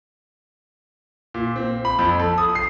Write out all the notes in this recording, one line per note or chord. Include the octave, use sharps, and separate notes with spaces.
A#2
C4
B5
F2
A4
D#6
C7